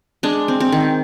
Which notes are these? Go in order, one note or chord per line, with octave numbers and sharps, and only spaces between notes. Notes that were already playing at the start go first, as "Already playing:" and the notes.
G#3 D4
C4
C4
D#3